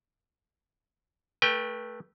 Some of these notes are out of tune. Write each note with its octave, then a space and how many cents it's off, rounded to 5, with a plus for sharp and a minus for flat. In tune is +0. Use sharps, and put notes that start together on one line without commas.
A3 +0 B4 -30 G5 +20